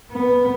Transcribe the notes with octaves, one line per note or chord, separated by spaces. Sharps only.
B3